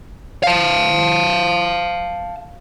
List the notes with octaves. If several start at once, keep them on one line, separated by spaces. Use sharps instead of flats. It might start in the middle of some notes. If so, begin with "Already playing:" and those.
F5 A5